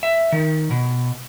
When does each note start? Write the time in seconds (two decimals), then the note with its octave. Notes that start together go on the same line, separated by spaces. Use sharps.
0.03 E5
0.32 D#3
0.71 B2